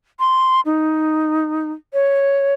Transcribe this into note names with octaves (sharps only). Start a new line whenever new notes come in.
C6
D#4
C#5